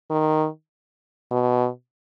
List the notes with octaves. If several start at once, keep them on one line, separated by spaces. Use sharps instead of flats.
D#3
B2